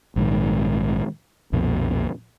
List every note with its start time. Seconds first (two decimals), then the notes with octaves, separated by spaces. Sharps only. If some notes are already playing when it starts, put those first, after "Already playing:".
0.16 A#1 G#2 D#3
1.52 B1 F2 A#2